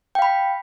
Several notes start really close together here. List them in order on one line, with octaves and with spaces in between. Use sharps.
G5 F5 B5